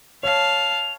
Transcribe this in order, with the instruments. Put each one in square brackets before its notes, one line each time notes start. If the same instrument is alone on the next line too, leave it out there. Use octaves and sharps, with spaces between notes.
[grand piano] C#5 [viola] F5 A5 [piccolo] F7